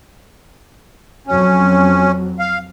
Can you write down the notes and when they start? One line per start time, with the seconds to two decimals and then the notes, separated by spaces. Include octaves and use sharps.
1.27 F2 F#3 C#4
2.40 F5